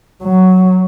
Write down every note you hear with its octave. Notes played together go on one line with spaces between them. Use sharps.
F#3